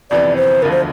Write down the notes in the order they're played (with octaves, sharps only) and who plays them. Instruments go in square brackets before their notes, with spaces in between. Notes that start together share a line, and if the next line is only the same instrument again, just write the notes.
[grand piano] G1 F2 C3 E3 [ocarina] D5
[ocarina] C5
[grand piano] E1 D2 D3 F3 [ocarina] A#4
[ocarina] C5